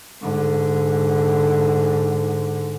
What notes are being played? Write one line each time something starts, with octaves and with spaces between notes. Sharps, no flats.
G#2 D3